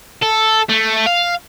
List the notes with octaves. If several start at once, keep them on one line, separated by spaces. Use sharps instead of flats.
A4
A3
F5